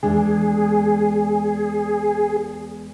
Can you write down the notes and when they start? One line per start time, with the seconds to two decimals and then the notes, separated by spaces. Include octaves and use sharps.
0.03 E2 G#3 D4 G#4